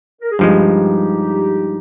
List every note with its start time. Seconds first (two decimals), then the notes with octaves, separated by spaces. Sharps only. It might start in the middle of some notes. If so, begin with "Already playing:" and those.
0.22 A#4
0.31 G#4
0.39 G2 F3 G#3 D#4 G4